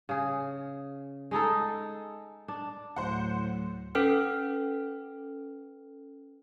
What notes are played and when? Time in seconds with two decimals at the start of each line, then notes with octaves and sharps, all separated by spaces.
0.09 C#3 G#4
1.31 G#3 D#4 G#4 A4
2.48 D4
2.96 D2 A2 F#3 C5 F#5
3.95 C#4 A4 B4 G5 F6